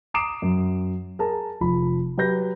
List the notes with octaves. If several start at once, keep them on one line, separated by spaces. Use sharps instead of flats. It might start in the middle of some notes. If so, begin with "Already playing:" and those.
A#5 D6 D#6 C7 D7 E7
F#2
G#4 A#4 A5
F1 F3 B5
F#3 G4 B4 G6 A#6